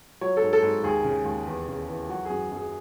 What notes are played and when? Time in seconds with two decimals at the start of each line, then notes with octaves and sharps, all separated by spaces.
0.21 F#3 C#5
0.37 G#2 A4
0.53 A4
0.62 G#2
0.84 D#2 G#4
1.04 C#3
1.25 D#2
1.47 E2
1.68 C#3
1.88 E3
2.09 F#3 F#4
2.25 F#2 G#4
2.52 F#2 G#4